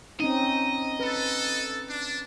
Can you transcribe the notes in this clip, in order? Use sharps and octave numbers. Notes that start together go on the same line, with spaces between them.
C4 C#4 D#4 D#5
A4 B4
D4